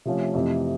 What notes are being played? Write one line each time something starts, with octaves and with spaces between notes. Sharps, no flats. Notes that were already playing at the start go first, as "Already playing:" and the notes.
C3 F3 A3 C#4
F2 C3 E3 A3